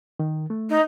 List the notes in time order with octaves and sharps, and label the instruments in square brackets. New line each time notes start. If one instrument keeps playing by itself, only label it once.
[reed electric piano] D#3
A3
[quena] D#4